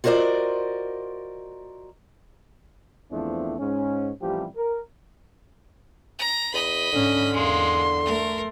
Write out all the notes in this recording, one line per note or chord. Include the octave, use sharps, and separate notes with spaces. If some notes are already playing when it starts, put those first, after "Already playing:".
F4 F#4 A#4 C5 D5 D#5
E2 F3 A3 C4 D4 E4
G#2 C#4
A1 C3 E3 F3 G3 G4
A#4
A#5
E2 D#5 B5
G#2 D3 C#4
E2 G#3 A#3 C6
A3 A#4